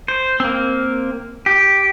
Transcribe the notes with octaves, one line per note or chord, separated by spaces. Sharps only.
C5
A#3 C4
G4